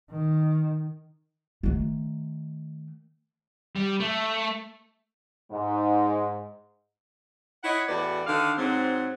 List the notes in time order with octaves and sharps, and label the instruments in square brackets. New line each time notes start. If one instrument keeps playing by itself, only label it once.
[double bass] D#3
[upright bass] D#3 A3
[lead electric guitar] G3
A3
[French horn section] G#2
[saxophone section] E4 C#5 D#5 F#5
E2 A2 F#4 B4 D5
D3 D#3 F5
G#2 F#3 C4